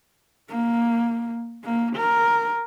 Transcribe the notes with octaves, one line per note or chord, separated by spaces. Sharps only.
A#3
A#3
A#4